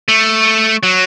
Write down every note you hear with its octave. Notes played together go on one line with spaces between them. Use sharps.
A3
F#3